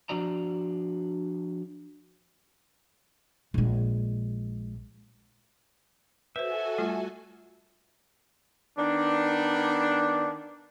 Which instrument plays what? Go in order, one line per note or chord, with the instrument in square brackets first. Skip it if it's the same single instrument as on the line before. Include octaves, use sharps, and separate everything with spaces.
[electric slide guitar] F3 D4 F#4 D5 A#5
[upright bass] A#1 G#3
[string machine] F#4 A4 G#5 [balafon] B4 C5 [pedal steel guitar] E5
[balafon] G3 A3 F4
[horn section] D#3 B3 D4